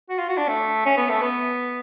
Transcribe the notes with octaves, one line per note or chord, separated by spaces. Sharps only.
F#4
F4
F#4
D4
A3
C#4
B3
A3
B3